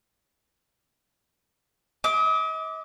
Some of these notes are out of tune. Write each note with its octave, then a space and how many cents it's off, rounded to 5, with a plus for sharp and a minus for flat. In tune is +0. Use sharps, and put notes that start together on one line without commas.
D#5 +40 D6 +0